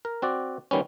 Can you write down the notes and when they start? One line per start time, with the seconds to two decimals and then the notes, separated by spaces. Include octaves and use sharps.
0.05 A#4
0.22 C4 F#4 D5
0.71 D#3 G3 B3 C#4